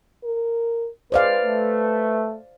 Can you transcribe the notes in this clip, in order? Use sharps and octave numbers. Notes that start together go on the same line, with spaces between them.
A#4
G#3 B4 C5 D5 F5
A3